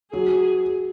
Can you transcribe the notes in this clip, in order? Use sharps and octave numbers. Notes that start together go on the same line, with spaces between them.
F#3 G#4